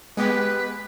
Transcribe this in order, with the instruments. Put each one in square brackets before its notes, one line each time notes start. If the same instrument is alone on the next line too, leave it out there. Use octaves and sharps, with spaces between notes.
[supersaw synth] G#3 B3 G4 [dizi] B4